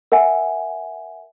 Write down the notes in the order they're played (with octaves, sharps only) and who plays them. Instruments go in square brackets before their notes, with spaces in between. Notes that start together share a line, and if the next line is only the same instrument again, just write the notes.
[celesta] A#4 E5 F#5 G#5